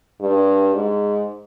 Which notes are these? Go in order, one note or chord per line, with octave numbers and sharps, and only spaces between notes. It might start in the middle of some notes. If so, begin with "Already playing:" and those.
G2
G#2